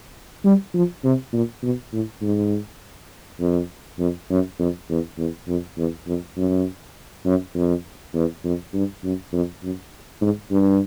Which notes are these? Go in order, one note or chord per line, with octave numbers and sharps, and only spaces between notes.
G3
F3
C3
A#2
B2
A2
G#2
F2
F2
F#2
F2
E2
E2
F2
E2
F2
F#2
F#2
F2
E2
F2
G2
F#2
F2
F#2
G#2
G2